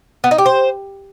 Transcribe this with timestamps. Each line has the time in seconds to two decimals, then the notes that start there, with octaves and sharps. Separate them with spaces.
0.24 B3
0.31 D#4
0.38 G4
0.46 C5